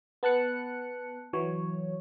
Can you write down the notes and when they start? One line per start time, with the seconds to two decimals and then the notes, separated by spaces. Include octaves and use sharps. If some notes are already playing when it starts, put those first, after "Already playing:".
0.23 B3 A5 F#6 C#7
1.33 E3 F#3 C#5